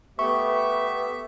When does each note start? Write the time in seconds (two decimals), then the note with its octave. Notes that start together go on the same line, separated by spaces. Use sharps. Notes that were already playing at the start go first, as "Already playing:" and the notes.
0.19 A3 B3 G4 B4 E5 C#6